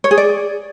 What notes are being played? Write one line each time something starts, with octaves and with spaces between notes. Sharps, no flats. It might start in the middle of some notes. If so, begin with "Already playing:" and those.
C#5
G#4
D5